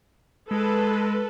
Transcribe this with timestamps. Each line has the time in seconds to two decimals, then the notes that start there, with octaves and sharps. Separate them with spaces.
0.51 G#3 A4 B4